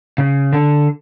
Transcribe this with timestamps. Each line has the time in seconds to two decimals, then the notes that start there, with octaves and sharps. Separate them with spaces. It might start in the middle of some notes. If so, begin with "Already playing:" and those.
0.18 C#3
0.53 D3